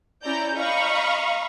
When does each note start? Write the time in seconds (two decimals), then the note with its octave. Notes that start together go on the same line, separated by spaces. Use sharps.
0.23 C#4 E4 D5 A#5 G6
0.55 D#5 F5 A#5 B5 C#6 D#6